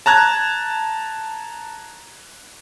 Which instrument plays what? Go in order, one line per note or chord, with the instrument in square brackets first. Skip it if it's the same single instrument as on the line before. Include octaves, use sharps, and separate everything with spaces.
[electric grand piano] A5 A#5 F#6 G#6